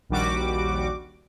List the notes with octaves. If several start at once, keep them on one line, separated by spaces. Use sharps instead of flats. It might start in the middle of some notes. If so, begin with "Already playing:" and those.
A#1 D#2 G3 F#4 D6